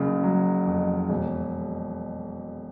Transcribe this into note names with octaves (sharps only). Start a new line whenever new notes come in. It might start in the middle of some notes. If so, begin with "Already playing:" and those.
Already playing: F#1 C#3
F#3
F2
E1